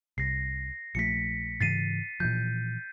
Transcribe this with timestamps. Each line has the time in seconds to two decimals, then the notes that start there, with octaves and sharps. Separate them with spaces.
0.18 C2 A#6 C7
0.95 A#1 F3 A3 B6 C#7
1.61 G#2 C#3 E3 A6 C7 D#7
2.20 A#2 E3 F3 G6